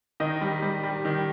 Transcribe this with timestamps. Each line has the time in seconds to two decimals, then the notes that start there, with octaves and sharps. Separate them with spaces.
0.20 D#3 D#5
0.41 G3
0.62 G3
0.83 G3
1.05 D#3